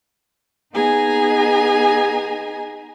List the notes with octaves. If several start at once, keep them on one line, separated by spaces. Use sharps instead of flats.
B3 D#4 G#4 G#5 A#5